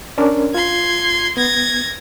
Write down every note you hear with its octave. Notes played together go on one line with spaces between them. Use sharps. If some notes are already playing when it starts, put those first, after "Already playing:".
C#4 D4 A#4
F4 C6 G#6
B3 G#6 A#6